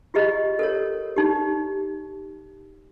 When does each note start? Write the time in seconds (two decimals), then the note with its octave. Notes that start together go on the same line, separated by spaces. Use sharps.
0.14 F4 G4 G#4 D#5
0.59 A4 A#4 C#5
1.16 D#4 G4